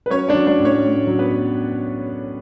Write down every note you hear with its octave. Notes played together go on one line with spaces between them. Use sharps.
B4
F#3 C#4 C#5
D4 D5
F#3
D4 D5
A2
C#4 C#5
A2
F#3
B3 B4
F#3